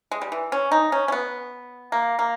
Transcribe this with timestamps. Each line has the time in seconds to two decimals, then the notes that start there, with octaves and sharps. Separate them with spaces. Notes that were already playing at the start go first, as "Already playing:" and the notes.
0.11 G#3
0.22 G3
0.32 E3
0.52 C#4
0.72 D#4
0.92 C#4
1.08 C#4
1.12 B3
1.92 A#3
2.19 A#3